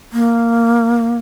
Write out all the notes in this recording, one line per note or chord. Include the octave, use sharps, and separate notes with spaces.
A#3